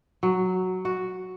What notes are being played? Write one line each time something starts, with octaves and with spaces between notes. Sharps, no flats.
F#3
F#4